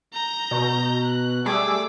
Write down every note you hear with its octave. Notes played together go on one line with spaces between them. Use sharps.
A#5 G6
B2
F#6
G3 A3 G#4 D6 E6